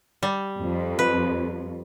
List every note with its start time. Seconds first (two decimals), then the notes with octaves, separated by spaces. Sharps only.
0.23 G3
0.61 F2
0.99 B4